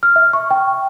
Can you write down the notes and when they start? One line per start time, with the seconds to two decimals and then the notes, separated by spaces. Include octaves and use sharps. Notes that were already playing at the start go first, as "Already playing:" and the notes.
0.03 F6
0.16 E5
0.33 C#6
0.50 G5